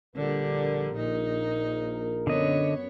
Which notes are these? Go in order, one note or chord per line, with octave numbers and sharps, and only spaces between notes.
A#1 D3 G3 A#4
A#2 D#4
F#2 D3 B3 C#5 D#5